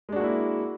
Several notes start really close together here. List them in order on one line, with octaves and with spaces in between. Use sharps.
G#3 D4 F#4 A#3 E4